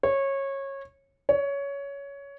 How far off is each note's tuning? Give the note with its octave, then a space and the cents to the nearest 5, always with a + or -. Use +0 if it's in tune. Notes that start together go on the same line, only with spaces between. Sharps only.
C#5 -20
C#5 +15